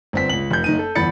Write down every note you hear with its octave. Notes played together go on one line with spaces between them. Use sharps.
G1 C4 B6
C#2 F#7
F1 G6
F#1 D#4 D#7
A4
G1 E2 B5 A6 C#7